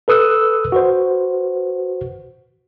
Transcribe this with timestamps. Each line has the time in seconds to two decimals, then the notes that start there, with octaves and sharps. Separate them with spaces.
0.08 A4 B4 D#6 E6 F#6
0.72 F#4 B4 C5